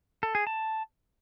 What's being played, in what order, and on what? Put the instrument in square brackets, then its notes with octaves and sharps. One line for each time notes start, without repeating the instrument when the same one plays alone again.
[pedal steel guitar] A4
G#4
A5